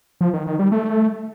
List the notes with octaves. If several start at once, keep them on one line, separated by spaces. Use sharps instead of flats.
F3
D#3
D#3
G3
A3